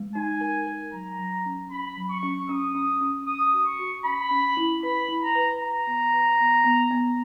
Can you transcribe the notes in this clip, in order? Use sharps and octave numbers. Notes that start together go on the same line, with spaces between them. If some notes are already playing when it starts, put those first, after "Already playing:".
Already playing: G#3
D#4 G#5
A#4
A#4
F#3 A#5
F#3
C#4
C#4 B5
F#3
C#6
C#4
C#4 D#6
C#4
C#4
C#4 D#6
F#4
C#6
F#4
C#4 B5
C#4
E4
B4 B5
E4
A#5
B4
B4 A#5
B3
B4
B3
B3
B3